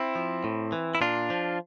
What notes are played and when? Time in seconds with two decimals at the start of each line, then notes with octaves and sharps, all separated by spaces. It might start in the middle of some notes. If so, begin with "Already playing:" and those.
Already playing: C4 E4
0.15 F3
0.44 A2
0.72 E3
0.95 E4
1.01 A#2 D4 F4
1.30 F3